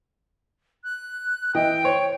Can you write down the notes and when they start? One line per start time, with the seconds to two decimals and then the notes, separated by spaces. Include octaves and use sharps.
0.84 F#6
1.55 E3 D#5 G5
1.84 C5 C#5